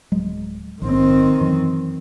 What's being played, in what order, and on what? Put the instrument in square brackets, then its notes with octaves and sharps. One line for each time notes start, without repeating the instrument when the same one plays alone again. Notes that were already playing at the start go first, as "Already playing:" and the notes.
[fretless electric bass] D1 F#3 G#3
[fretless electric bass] A#1 G#2 [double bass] D#3 C4
[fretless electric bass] F#2 E3 F#3